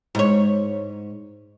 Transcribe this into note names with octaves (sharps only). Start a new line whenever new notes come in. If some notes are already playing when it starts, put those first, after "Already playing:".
G#2 C#5